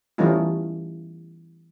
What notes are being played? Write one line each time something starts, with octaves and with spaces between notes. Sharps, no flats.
E3 G3 A3 C#4 D#4 F4